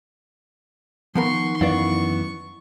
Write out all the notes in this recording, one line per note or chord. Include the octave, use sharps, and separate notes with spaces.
D#3 F3 B3 A#4 C6 C#6
F#2 E3 B3 D5 F5 C#6